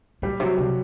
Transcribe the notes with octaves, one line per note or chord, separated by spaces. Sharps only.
A#2 G3
C3 F#3
C3 G3